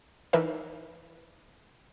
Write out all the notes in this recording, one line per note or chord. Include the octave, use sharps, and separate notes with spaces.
E3 D#4 A#4 B4 E5